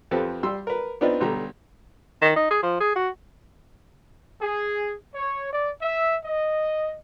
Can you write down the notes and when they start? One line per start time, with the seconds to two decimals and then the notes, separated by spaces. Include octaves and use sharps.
0.11 F2 F3 C4 G4 A4 B4
0.43 G3 C6 E6
0.67 A#4 B4
1.01 B3 C4 D4 D#4 F4 B4
1.21 B1 D3 G3 A#5
2.22 D#3
2.36 D#4
2.51 G#4
2.63 F3
2.80 G#4
2.96 F#4
4.40 G#4
5.15 C#5
5.51 D5
5.82 E5
6.24 D#5